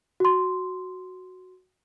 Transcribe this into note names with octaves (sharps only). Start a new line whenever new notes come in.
F#4 C6